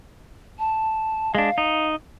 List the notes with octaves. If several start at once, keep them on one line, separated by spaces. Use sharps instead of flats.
A5
G#3 D4 F5
D#4